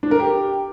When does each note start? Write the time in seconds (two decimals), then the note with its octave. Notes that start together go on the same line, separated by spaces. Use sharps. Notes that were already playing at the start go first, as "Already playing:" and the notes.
0.03 D4
0.11 A#4
0.20 G4